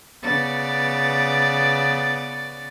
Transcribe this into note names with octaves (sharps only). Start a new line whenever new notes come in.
C#3 B3 B4 D5 A6